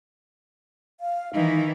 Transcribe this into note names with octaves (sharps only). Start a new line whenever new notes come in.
F5
D#3 E3 D#4